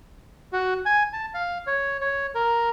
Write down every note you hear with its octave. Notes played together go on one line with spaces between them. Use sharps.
F#4
G#5
A5
F5
C#5
C#5
A#4